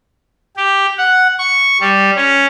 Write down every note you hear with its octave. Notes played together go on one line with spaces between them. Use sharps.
G4
F#5
C#6
G3
C#4